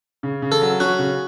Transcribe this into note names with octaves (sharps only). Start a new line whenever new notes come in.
C#3
C#3
A4
F#3
C#4 F#4
C#3